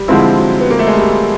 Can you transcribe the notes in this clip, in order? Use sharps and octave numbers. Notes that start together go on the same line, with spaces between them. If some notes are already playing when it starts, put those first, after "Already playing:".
Already playing: G3
D3 F3 G#3 C4 E4
F#3
B3
A#3
A3
G#3
G3